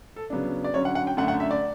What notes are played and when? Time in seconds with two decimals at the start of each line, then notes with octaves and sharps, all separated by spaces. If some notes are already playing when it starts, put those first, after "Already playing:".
0.16 A4
0.30 C#3 F#3 B3 D4
0.64 D5
0.74 D3 F#3 C#4 C#5
0.85 F#5
0.95 F#5
1.07 G5
1.17 F#2 D3 A3 F#5
1.28 F#5
1.40 E5
1.51 D5